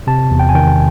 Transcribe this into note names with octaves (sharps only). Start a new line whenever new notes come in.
C3 A5
E2
G5
G#5
D#3 G5